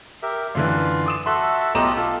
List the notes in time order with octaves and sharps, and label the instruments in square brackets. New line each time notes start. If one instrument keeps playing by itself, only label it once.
[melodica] G4 A#4 E5
[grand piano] F#2 D3 E3 [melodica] F4 F5
[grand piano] D6 D#6 E7
[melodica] F#4 A4 E5 [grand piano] C6 F#6
[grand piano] B1 A#5 E7 [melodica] F4 G4 D#5
[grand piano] F4 [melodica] A4